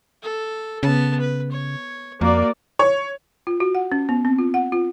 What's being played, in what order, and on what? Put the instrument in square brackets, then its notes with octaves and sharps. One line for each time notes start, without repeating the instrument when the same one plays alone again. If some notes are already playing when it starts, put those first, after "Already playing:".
[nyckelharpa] A4
[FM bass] C#3 [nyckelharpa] B3 A5
[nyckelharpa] B4
C#5
[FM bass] F2 [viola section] A#3 D5 [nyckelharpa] F#4
[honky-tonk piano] C#5
[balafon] F4
F#4
F#5
C#4
B3
C4
F4
F#5
F4